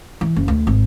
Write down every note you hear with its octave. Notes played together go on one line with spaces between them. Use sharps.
E3
F#1
D2
G#1